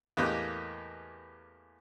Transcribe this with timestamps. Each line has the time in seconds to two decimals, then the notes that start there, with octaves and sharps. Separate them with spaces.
0.17 E2 A2 A#3 G4 D#5 F#6